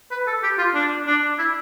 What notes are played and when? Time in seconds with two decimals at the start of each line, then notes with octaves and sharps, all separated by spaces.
0.11 B4
0.27 A4
0.43 G4
0.58 F4
0.75 D4
1.07 D4
1.39 E4